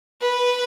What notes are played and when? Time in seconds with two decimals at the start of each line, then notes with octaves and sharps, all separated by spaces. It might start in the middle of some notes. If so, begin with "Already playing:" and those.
0.21 B4